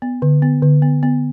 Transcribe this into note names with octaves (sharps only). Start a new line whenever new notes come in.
B3
D3
B3
D3
B3
B3